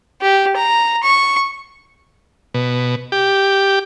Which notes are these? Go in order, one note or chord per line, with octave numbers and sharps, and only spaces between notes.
G4
A#5
C#6
B2
G4